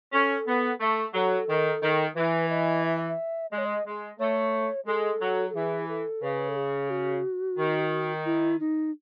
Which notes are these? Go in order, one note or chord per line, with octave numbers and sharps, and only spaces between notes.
C#4 A4
B3
A3
F#3 A4
D#3
D#3
E3 B4
D#5
E5
E5
G#3 D#5
C#5
D#5
G#3
A3 C#5
G#3 A4
F#3
A4
E3 G#4
A4
C#3 B4
A4
G#4
F#4
D#3
E4
D#4